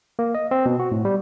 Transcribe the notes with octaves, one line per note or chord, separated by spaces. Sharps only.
A#3
D#5
C4
B2
F#4
A2
G3